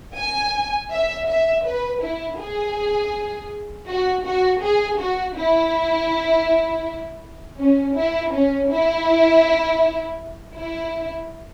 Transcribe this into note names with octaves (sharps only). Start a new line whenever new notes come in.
G#5
E5
E5
B4
E4
G#4
F#4
F#4
G#4
F#4
E4
C#4
E4
C#4
E4
E4